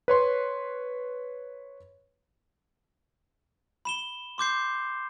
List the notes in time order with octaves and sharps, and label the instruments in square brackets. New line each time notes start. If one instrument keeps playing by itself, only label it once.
[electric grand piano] B4 C#5 C6
[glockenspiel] B5 E7 G7
C6 D6 G6 C7